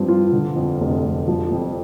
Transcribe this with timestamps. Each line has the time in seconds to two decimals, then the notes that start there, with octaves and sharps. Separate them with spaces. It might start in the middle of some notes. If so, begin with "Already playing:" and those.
Already playing: G2 F3 C4
0.08 F4
0.32 D3
0.56 F2
0.80 F1
1.04 F1
1.28 F3
1.52 F2